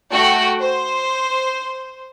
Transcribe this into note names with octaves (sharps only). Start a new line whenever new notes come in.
A3 F#4 F#5 G5
C5